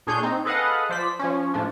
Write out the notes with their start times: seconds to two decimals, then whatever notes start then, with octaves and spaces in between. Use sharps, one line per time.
0.07 A#2 D4 G#4 C#5 C6 G6
0.23 C4 D#4
0.45 G#4 A4 B4 D#5 F5 F#5
0.89 F3 C5 D5 B6
1.19 F3 C#4
1.54 A2 F3 D4